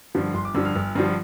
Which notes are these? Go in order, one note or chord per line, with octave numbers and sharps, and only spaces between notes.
G2 D3 F3
G1 C6
D6
G2 D3 F3 E6
F6
G1 E6
G2 D3 F3